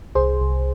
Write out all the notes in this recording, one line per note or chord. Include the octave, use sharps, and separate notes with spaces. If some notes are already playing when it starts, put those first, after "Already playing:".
C2 G#4 C5
C2